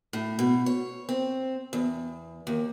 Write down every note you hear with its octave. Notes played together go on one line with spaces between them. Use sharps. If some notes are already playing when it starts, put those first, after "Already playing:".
A2
B2
C#5
C4
E2
D#2